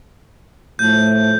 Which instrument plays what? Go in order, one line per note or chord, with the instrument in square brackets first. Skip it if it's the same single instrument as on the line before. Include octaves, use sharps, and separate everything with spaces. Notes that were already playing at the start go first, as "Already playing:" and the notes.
[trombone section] A2 F3 A3 [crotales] G6